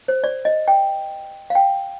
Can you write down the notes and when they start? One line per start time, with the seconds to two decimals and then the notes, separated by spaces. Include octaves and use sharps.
0.08 C5
0.24 D5
0.45 D#5
0.68 G5
1.50 F5
1.55 G5